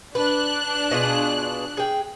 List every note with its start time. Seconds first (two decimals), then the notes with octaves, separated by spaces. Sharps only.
0.15 D4 B4 F#6
0.91 B2 F4 G#4
1.77 G#4 G5